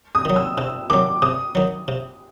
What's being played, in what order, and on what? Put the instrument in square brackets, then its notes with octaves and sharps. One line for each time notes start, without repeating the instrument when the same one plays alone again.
[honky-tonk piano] D#6
[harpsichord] D#3 F#3
[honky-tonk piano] E6
[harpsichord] C3 [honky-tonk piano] E6
[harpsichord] D#3 F#3 [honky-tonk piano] D6
[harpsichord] C3 [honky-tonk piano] D#6
[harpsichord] D#3 F#3
C3